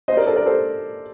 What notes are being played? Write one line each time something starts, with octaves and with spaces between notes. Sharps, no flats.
C5 D#5
A#4 D5
A4 C5
A#4 D5
A4 C5